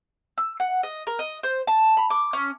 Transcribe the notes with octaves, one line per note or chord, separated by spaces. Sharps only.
E6
F#5
D#5
A#4
D#5
C5
A5
B5
D6
C#4